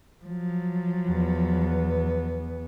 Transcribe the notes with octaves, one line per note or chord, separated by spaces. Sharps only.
F3 F#3
E2 B3